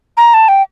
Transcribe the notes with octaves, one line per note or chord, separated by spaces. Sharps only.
A#5
A5
G5